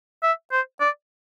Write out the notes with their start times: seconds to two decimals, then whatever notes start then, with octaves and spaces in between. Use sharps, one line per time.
0.23 E5
0.52 C5
0.80 D5